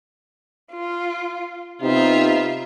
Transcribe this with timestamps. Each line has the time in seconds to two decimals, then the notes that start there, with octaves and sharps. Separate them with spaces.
0.72 F4
1.82 C3 B3 C4 D#4 F4 E5